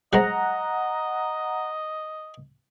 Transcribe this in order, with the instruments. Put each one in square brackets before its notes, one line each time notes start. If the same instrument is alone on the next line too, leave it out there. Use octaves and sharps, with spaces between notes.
[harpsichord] F#3 G#3 C5 [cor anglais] D#5 [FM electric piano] F#5 A#5